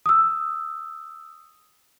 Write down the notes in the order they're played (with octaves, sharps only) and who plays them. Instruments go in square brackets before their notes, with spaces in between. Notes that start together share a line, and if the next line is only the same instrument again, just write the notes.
[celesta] D#6 E6